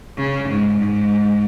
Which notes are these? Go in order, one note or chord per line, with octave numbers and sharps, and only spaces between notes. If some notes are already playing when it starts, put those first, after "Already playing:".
C#3
G#2
G#2